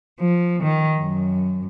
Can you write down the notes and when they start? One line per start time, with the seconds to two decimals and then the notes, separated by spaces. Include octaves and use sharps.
0.20 F3
0.63 D#3
0.99 F#2